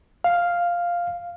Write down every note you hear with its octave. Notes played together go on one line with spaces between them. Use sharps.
F5